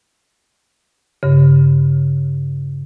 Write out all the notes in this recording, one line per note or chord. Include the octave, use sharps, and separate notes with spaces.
G2 C#3